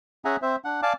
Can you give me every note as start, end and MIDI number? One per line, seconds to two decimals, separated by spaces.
0.25 0.36 61
0.25 0.36 68
0.25 0.36 76
0.25 0.36 78
0.25 0.36 80
0.25 0.36 82
0.42 0.56 60
0.42 0.56 72
0.42 0.56 76
0.65 0.81 62
0.65 0.81 78
0.82 0.93 74
0.82 0.93 77
0.82 0.93 80
0.82 0.93 81
0.82 0.93 86